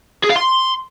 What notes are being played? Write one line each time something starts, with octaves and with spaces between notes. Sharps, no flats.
G#4
F5
C6